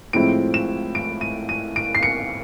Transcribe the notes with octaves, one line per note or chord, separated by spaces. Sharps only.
A2 F3 G#3 C4 E4 D7
E7
D7
D#7
D#7
D7
C7
C#7